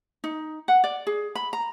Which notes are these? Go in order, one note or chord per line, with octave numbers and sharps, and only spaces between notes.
D#4
F#5
D5
G#4
B5
A#5